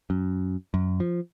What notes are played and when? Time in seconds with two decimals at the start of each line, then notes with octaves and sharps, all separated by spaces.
0.10 F#2
0.74 F#2
1.00 F3